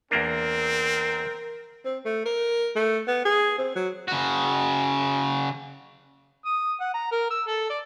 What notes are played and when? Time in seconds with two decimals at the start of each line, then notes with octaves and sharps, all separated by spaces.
0.11 E2 A#3 C4 D4 A#4
1.85 C4
2.05 A3
2.25 A#4
2.75 A3
3.07 B3
3.25 G#4
3.58 C4
3.75 F#3
4.08 C#3 F#4
6.45 D#6
6.81 F#5
6.94 A#5
7.12 A#4
7.30 E6
7.48 A4
7.70 D5